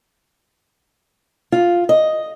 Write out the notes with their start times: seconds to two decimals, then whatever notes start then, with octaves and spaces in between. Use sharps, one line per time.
1.52 F4
1.89 D#5